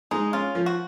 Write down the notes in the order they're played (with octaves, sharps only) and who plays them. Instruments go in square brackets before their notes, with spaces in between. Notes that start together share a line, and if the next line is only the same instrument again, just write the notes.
[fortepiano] G#3 [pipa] D#4
[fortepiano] C#4 [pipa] F4
[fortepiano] F3
[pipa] F#4